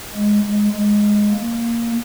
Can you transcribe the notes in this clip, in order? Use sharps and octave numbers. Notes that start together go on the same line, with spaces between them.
G#3
G#3
G#3
A#3